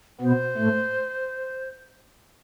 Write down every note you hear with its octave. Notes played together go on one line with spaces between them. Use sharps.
B2 B3 C5
A2 A3